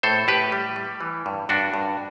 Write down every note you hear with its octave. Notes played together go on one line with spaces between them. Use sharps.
A2 A4 C5
A2 G4 B4
G3
G3
E3
G2
G2 D4 F#4
G2